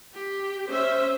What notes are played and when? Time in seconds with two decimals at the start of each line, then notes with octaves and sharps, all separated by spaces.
0.14 G4
0.69 C#4 C5 E5